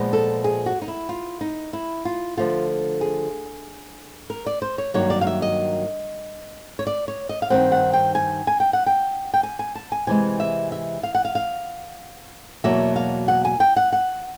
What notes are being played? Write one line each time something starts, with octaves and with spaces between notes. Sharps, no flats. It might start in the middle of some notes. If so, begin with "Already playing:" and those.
Already playing: A#2 F3 G#3 B3
A4
G#4
F#4
D#4
E4
F4
D#4
E4
F4
D3 F3 A3 F4
G#4
A#4
D5
C5
C#5
G2 D#3 F#3 A#3 C#5
D5
F5
E5
D#5
C#5
D5
C#5
D#5
F5
G2 D#3 G#3 C4 F#5
F#5
G5
G#5
G#5
G5
F#5
G5
G5
G#5
G#5
A5
G#5
C3 E3 G#3 G#5
E5
E5
F5
F#5
F5
F5
E2 B2 F#3 A#3 E5
F5
F#5
G#5
G5
F#5
F#5